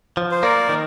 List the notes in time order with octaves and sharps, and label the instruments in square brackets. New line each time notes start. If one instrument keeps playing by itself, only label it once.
[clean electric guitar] F3
[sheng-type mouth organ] C5
[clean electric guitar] A#3 [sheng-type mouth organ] A#4 D5
[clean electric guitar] D#3